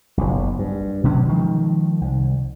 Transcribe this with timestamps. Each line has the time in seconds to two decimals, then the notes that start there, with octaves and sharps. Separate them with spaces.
0.17 F#1 B1
0.59 G2
1.04 B2 D3 F#3 C#4
1.28 D#3 F3 G#3
2.01 C2